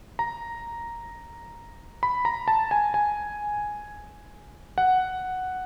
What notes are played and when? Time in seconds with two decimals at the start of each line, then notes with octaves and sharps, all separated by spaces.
0.19 A#5
2.03 B5
2.25 A#5
2.48 A5
2.71 G#5
2.94 G#5
4.78 F#5